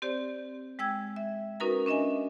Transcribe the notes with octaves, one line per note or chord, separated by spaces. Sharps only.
C4 G4 C5 D5
G#3 G5 E6 G#6
E5
C#4 D#4 F#4 A#4 B4 A#5
C#4 D4 D#5 E5 G#5